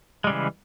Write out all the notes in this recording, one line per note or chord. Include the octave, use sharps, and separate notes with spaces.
C#3 E3 G3 G#3